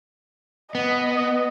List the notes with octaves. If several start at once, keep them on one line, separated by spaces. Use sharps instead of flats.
B3 D#5